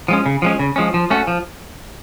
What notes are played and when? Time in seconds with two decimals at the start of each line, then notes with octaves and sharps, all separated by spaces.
0.08 F3 G#3 C#4
0.26 C#3
0.42 F3 G#3 C#4
0.59 C#3
0.76 F3 G#3 C#4
0.94 F3
1.10 A3 C#4 F#4
1.27 F3